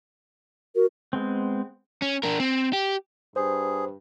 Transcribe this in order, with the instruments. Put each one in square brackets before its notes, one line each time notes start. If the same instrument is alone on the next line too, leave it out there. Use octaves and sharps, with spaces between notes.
[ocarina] F#4 [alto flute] A#4
[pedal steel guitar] G#3 B3 C4
[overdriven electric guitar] C#4
D4 A#4
C4
G4
[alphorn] G2 [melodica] G#4 [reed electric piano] C5